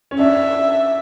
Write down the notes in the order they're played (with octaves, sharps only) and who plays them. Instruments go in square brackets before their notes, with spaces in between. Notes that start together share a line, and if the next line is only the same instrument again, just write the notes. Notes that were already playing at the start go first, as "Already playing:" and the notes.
[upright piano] C#4
[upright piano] D4 [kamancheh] E5